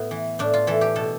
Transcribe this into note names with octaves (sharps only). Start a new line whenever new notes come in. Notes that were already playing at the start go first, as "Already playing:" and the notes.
Already playing: A2 B3
E3
A2 D4
F4
E3 A4
G4
B2 A4